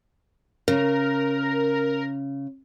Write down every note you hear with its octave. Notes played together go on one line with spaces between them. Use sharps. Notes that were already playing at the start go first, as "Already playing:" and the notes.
C#3 A#4